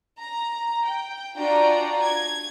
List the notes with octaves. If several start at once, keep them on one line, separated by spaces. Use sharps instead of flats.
A#5
G5
D4 F4 F#4 D5 G5 A#5
G#6